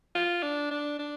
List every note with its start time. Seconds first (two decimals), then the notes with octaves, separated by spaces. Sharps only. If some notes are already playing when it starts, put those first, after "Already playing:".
0.15 F4
0.43 D4
0.71 D4
0.99 D4